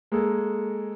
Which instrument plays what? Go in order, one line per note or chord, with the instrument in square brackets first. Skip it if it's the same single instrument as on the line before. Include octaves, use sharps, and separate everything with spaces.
[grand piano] G#3 A#3 G#4 A4